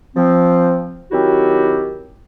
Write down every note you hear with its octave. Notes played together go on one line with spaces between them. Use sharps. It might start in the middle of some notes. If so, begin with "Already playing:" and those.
F3 C4
D#3 F#3 C4 E4 F#4 G4